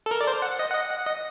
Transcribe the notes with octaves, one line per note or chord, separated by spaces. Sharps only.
A4
A#4
D5
C5
F#5
D#5
F#5
D#5
F#5
D#5